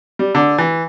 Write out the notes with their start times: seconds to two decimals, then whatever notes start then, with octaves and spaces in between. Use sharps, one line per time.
0.19 G3
0.35 D3
0.59 E3